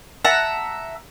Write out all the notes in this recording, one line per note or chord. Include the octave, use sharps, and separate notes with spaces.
E5 F#5 A5 A#5